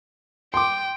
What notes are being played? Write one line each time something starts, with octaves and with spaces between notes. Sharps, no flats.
G5 C6 D6